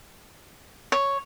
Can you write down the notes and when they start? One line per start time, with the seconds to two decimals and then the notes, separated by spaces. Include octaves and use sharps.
0.92 C#5